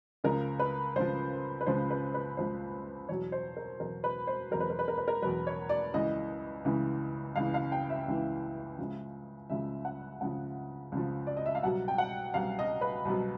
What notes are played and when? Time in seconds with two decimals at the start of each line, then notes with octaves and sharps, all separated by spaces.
0.24 C#2 C#3 F3 A#4
0.59 B4
0.96 C#2 C#3 F3 C5
1.61 B4
1.66 C#2 C#3 F3 C5
1.90 B4
2.14 B4
2.37 C#2 C#3 F3 C5
3.09 E2 B2 F#3 C#5
3.32 C5
3.57 A#4
3.80 E2 B2 F#3 A#4
4.04 B4
4.27 C5
4.51 E2 B2 F#3 A#4
4.60 B4
4.70 A#4
4.79 B4
4.88 A#4
4.98 B4
5.08 A#4
5.22 E2 B2 F#3 B4
5.47 C#5
5.69 D5
5.94 C#2 C#3 E3 D#5
6.65 C#2 C#3 E3
7.36 C#2 C#3 E3 F5
7.54 F5
7.72 G5
7.90 E5
8.08 C#2 C#3 E3
8.78 C#2 C#3 F3
9.50 C#2 C#3 F3 E5
9.85 F#5
10.21 C#2 C#3 F3 F#5
10.92 C#2 C#3 F3
11.27 D5
11.37 D#5
11.46 E5
11.55 F5
11.63 C2 B2 F#3 F#5
11.88 G5
11.98 F#5
12.34 C2 B2 F#3 F5
12.59 D#5
12.81 B4
13.05 C2 B2 F#3